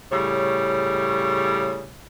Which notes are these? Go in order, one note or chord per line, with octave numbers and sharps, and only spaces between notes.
A2 C#3 G3 C#5